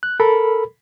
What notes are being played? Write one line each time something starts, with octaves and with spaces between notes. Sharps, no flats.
F#6
A4 A#4 B5